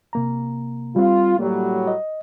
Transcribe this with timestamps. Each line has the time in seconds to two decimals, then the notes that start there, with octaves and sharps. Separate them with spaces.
0.13 C3 A#3 A#5
0.96 G3 C4 F4
1.39 A2 F#3 G3 A#3
1.87 D#5